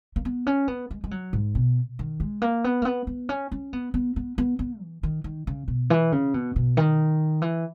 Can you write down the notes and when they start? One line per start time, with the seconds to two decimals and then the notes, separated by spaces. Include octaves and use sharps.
0.16 A#3
0.25 B3
0.47 C#4
0.68 B3
0.91 G#3
1.04 G#3
1.11 F#3
1.33 G#2
1.55 B2
1.99 D#3
2.20 G#3
2.42 A#3
2.64 B3
2.82 A#3
2.85 B3
3.07 B3
3.29 C#4
3.52 C#4
3.73 B3
3.94 B3
4.16 B3
4.38 B3
4.59 B3
4.81 E3
5.03 D#3
5.24 D#3
5.47 C#3
5.68 B2
5.90 E3
6.12 C#3
6.34 B2
6.56 B2
6.77 D#3
7.42 E3